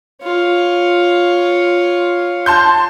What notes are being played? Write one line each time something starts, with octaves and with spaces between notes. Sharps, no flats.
F4 C#5
A5 C6 G6